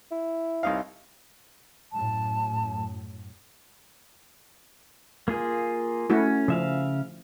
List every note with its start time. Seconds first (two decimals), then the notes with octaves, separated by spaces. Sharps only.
0.11 E4
0.63 C2 D#4 F5
1.93 F#2 A2 A5
5.28 A#3 F4 G#4
6.10 A3 C#4 E4 F#4
6.48 C#3 F3 E5 F5